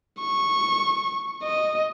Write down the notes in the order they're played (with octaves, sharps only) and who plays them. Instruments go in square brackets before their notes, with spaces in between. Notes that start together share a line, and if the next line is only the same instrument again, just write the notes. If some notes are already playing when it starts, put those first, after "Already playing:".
[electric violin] C#6
D#5